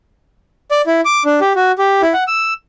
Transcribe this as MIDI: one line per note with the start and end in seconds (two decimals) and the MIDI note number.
0.71 0.82 74
0.87 1.01 64
1.05 1.23 86
1.25 1.40 62
1.41 1.53 67
1.56 1.72 66
1.79 2.02 67
2.02 2.13 64
2.13 2.24 78
2.28 2.54 88